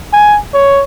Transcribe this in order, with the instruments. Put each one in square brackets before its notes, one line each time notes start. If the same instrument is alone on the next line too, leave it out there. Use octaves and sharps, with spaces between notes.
[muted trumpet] G#5
C#5